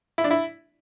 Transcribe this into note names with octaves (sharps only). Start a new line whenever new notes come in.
E4
D4
E4